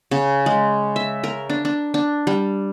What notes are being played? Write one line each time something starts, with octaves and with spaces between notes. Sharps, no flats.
C#3
G#3
E5
A#4
D4
D4
D4
G3